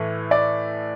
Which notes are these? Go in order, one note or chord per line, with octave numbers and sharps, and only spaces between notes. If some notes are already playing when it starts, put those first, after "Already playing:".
Already playing: A2 E3 A3
D5